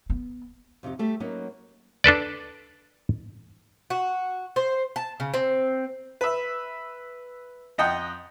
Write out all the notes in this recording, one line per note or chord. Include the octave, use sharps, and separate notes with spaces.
B3
F2 C3 D4 D#4 G4
G3 A3 G4
F#3 A#3 B3 C#4 D#4
D4 A4 B4 D5
F#4
C5
A5
C#3
C4
B4 E5
F2 D#5 F#5 G5